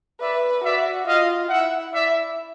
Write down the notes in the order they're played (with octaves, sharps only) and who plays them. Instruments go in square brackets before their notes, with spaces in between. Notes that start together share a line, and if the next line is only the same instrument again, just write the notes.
[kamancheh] B4 [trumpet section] D5 E5
[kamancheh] F#4 [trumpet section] D5 E5
[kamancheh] F4 [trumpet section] D#5 F5
[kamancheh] E4 [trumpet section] E5 F#5
[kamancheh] E4 [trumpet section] D5 E5